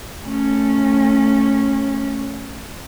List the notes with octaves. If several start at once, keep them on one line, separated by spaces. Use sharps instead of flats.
A3 C#4